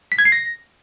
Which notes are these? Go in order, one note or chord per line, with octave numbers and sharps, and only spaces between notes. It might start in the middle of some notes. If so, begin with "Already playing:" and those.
B6
G#6
C7
A#6